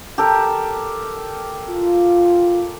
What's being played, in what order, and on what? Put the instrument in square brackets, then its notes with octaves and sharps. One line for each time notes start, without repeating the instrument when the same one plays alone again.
[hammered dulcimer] G4 A4 A#4
[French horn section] F4